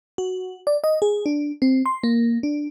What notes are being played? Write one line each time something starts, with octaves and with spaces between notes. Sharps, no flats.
F#4
D5
D#5
G#4
D4
C4
C6
A#3
D4